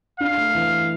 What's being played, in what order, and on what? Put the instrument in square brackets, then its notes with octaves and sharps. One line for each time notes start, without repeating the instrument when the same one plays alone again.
[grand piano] D4 [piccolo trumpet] F5
[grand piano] A3
E3